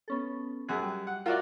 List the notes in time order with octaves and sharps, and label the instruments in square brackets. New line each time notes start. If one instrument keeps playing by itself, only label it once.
[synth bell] B3 C#4 A4
[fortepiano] F#2 G#4 [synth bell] F#6
[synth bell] G3
[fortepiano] F#5
[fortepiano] F4 F#4 D5 [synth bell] A#4 E5